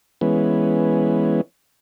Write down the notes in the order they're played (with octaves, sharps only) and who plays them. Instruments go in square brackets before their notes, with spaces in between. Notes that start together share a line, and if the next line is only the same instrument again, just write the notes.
[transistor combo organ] E3 G#3 B3 C#4